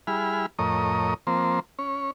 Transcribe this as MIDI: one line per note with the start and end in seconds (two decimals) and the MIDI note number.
0.07 0.46 55
0.07 0.46 64
0.07 0.46 68
0.07 0.46 83
0.07 0.46 89
0.59 1.14 41
0.59 1.14 45
0.59 1.14 70
0.59 1.14 73
0.59 1.14 75
0.59 1.14 87
1.27 1.60 53
1.27 1.60 58
1.27 1.60 60
1.27 1.60 72
1.79 2.11 61
1.79 2.11 73